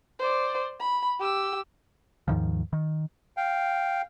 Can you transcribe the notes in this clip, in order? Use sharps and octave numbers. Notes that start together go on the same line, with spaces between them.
C5 D5
B5
G4 E6
D#2 G#2 D#3 F3
D#3
F5 G5